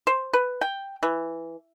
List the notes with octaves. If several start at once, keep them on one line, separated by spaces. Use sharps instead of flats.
C5
B4
G5
E3